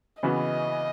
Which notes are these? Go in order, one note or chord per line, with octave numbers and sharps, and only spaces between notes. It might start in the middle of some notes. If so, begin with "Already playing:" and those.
C#3 E3 B3 F#4 D#5